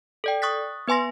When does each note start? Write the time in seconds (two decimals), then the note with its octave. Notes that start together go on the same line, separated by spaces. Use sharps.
0.24 A4 D5 G5
0.42 C#6 D#6 F#6 A6 B6
0.88 B3 B4 G#5 C6 A#6